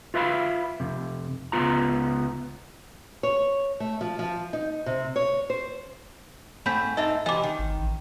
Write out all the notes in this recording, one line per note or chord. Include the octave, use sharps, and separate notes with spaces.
F4 B4 E5 F5 B5
F2 C3
C#2 B3 F4 A#5
C#5
A3
F3
F3
D#4
C3
C#5
C5
G#2 A3 C4 B5 G6 B6
G#2 D#4 A4 D#5 E5
C3 E3 D#5 D6
D#3
G#1
A1